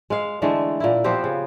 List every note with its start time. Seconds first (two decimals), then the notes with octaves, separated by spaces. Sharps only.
0.10 G#3 F5
0.42 D3 E3 G#3 A3
0.80 A#2 A#3 E4
1.04 F3 B3 C4 G4
1.24 C#3